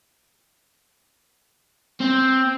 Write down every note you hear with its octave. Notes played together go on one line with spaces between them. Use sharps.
C4